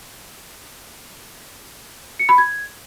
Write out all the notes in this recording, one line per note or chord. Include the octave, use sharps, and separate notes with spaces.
C#7
B5
G#6